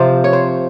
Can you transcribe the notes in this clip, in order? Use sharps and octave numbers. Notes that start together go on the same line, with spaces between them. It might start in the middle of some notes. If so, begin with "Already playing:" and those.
Already playing: C3 F3 C5
C#5
C5